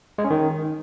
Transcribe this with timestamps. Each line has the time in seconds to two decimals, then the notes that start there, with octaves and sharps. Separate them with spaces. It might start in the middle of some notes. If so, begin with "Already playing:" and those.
0.18 G#3
0.24 C#4
0.30 D#3